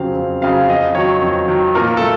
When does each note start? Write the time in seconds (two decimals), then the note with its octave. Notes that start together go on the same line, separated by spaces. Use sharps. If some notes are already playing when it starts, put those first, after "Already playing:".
Already playing: F2 C#3 F#3 C4 F5
0.15 F2
0.42 C#3 F#3 C4 F5
0.68 F2 D#5
0.95 D#3 F#3 C#5
1.22 F2
1.48 D#3 F#3
1.75 A#2 A#4
1.97 A4
2.01 A3